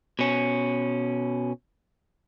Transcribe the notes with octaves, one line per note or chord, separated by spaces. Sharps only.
B2 C#4